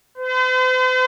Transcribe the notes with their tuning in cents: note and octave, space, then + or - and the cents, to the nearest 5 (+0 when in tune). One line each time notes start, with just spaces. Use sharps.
C5 -45